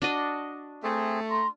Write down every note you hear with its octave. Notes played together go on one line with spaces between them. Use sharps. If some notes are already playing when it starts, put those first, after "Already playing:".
D4 F#4 D#5
A3 C4 G#4
A#5 C6